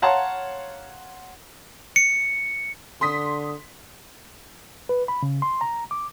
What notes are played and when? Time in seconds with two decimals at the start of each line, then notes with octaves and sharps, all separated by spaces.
0.02 C#5 F5 F#5 A5 A#5 C6
1.96 C#7
3.01 D3 C6 D#6 B6
4.89 B4
5.08 B5
5.23 C#3
5.42 C6
5.61 A#5
5.91 D6